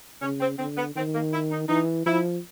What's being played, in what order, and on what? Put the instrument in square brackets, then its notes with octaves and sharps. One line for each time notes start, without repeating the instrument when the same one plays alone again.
[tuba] C#3 [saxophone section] C#4
[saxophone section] C4
[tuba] D3 [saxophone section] C4
[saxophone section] B3
[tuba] D#3 [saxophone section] C4
[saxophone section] A#3
E4
D#4
[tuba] E3 [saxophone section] D#4
[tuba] F3 [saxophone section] E4